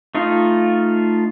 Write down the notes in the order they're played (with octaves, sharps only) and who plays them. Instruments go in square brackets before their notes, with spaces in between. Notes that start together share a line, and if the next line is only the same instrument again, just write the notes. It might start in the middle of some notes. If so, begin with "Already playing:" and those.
[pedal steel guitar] A3 D#4 F4